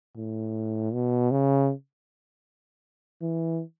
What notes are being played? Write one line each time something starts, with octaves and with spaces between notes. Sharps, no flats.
A2
B2
C#3
E3